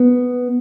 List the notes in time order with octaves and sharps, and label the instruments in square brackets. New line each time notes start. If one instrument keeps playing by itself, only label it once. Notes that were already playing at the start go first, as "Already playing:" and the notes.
Already playing: [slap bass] B3